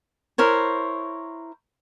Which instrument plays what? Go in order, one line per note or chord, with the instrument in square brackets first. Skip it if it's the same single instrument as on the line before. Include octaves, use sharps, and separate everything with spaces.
[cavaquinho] E4 A#4 C5 C#5